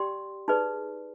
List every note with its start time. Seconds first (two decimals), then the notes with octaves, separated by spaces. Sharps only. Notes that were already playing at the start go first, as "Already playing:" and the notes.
Already playing: G4 D5 G5 C6
0.48 D#4 G#4 B4 D5